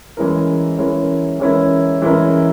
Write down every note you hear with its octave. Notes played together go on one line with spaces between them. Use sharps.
E3 G#3 C#4 E4 A#4
E3 G#3 C#4 E4 A#4
E3 G#3 C#4 E4 A#4
E3 G#3 C#4 E4 A#4